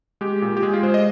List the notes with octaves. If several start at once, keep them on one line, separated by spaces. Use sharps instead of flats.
G#3 G4
A#2
G4
G#3 G#4
F4
G#3 C5
D#5